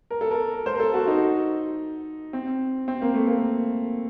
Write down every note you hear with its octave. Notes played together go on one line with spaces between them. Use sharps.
A#4
A4
A#4
C5
A#4
A4
F#4
D#4
C4
C4
A#3
A3
A#3